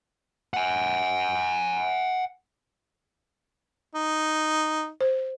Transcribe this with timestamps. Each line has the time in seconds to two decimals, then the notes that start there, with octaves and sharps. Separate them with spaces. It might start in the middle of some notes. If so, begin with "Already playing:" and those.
0.54 F#5 G#5
3.95 D#4
5.01 C5